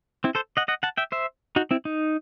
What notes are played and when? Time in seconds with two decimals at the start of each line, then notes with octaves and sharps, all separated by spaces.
0.24 C4 E4
0.35 A4 C5
0.57 D#5 F#5
0.68 D#5 F#5
0.83 F#5 A5
0.97 E5 G5
1.12 C5 E5
1.56 D#4 F#4
1.71 C4 E4
1.85 D#4